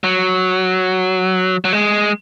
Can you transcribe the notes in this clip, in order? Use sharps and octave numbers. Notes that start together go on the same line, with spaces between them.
F#3
F#3
G#3